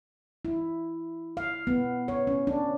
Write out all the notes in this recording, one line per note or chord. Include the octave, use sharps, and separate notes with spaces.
E4
F5
B3
C#5
C#4
D4